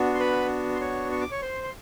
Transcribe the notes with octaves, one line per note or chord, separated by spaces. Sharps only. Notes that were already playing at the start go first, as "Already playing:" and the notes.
Already playing: B3 D4 F#4
C6
B4 B5
C6
C#5 C#6
C#6
D6
C#5 C#6
C5 C6
C6